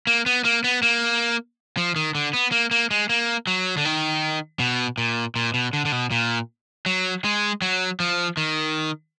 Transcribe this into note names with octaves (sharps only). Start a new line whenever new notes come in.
A#3
B3
A#3
B3
A#3
F3
D#3
D3
B3
A#3
A#3
G#3
A#3
F#3
D3
D#3
B2
A#2
A#2
B2
D3
D3
B2
A#2
F#3
G#3
F#3
F3
D#3